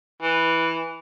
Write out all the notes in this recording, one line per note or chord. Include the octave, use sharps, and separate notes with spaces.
E3